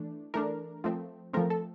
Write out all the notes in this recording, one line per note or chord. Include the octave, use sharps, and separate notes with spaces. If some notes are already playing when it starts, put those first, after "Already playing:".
Already playing: E3 A3 D4
E3 A3 D4 A#4
F3 A3 C4
F3 A3 C4 A#4
A4